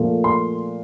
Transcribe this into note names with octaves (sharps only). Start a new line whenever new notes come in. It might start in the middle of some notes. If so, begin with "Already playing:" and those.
Already playing: A#2 F3 A3
C6